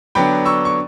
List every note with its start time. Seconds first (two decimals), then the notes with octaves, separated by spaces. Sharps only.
0.15 D3 F#3 B3 D4 G5 B5
0.45 C#6 E6
0.65 C#6